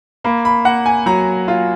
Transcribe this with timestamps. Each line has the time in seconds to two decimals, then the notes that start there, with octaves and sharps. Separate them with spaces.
0.24 A#3 B5
0.45 B5
0.65 A#3 F#5
0.86 G#5
1.06 F#3 A#5
1.48 F4